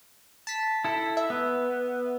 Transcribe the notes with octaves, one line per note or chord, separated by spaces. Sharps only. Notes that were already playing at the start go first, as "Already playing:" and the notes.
A5 B6
E4 A4
E5
B3